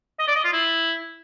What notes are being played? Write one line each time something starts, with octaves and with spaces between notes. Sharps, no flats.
D#5
D5
D#5
F4
E4